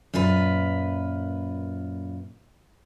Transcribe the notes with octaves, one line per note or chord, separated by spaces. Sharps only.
F#2 A#2 F4 B4